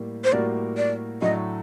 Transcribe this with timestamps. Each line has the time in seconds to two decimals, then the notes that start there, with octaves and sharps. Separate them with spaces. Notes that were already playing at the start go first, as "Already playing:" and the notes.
Already playing: A2 G3 A#3
0.24 C5
0.32 A2 G3 A#3 F#4 A#4 D5
0.77 D5
1.22 A2 F#3 A3 D4 D#5